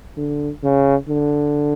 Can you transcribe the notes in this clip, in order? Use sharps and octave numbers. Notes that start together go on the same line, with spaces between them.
D3
C#3
D3